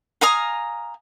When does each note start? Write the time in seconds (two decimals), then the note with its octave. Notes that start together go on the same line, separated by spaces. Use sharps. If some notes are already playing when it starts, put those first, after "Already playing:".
0.21 F5 G#5 A#5 D#6